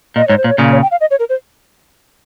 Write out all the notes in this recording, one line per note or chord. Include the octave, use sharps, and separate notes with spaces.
A#2 D#5
G#2 C#5
C5
A#2
C#5
A#2 C#3
C#5
G5
F5
D#5
C#5
A#4
C5